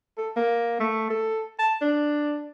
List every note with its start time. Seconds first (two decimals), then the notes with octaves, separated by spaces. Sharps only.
0.18 A4
0.37 A#3
0.80 A3
1.10 A4
1.59 A5
1.82 D4